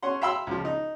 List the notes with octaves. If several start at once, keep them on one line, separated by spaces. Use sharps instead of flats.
C#4 F#5 C6
E5 F5 G5 B5 C6 E6
C#2 F3
D#4